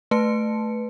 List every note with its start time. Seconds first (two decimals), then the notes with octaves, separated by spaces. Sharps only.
0.11 A3 B4 A5 C#7